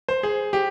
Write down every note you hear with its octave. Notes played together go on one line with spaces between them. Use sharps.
C5
G#4
G4